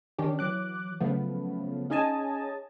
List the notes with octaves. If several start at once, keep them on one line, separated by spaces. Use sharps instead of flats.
D#3 C#4 D4 G4
E3 F#3 D6 F#6
C#3 F3 F#3 A3 B3
C#4 D#4 G#4 D#5 G#5 A5